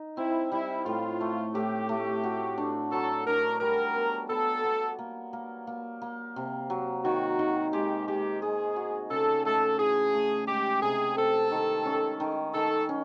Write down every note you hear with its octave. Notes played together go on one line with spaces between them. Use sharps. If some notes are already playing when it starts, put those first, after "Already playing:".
Already playing: D#4
C4 E4
G3 E4
A2 F4
A3
A2 G4
A3
F#4
D4
F#3 A4
D4 A#4
G3 A#4
B3
B3 A4
B3
A#3
A#3
A#3
A#3
C3
F#3
D#3 F#4
D#3
G#3 G4
G#3 G4
G#3 G#4
F#4
C#3 A4
A3 A4
E3 G#4
A3
G#3 G4
C3 G#4
C4 A4
D#3
C#4
D#3
D#3 A4
C#4